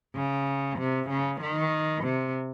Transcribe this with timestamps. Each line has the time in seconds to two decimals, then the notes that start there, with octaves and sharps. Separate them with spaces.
0.15 C#3
0.79 C3
1.10 C#3
1.41 D#3
2.04 C3